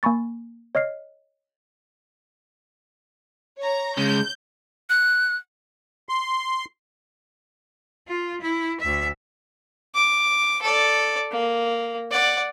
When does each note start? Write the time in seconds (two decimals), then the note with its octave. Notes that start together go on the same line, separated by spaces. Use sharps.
0.03 A#3 G#5 B5 C#6 A6
0.75 C#5 D#5 F6 C7
3.60 C#5 A#5
3.97 C#3 G#3 G6
4.90 F#6
6.09 C6
8.07 F4
8.41 E4
8.81 D2 E5
9.95 D6
10.62 A4 D5
11.31 A#3
12.11 D5 F#5